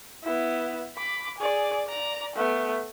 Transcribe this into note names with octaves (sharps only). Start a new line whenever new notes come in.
B3 E4
B5 D6
G#4 D5
D5 A#5
A3 B3